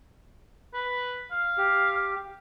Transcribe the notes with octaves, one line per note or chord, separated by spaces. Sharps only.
B4
F5
G4